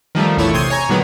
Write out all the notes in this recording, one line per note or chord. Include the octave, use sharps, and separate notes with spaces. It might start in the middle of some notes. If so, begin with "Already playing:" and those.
D#3 F3 G3 A3
A#1 E2 A3 E4 C#5
C3 C6 D#6 G6 G#6
C#5 G#5 A#5
A#2 D3 D#3 F#3 G#3 B3